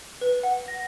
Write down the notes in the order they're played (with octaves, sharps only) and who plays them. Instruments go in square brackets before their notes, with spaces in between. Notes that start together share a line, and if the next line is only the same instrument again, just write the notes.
[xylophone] B4
F#5
A#6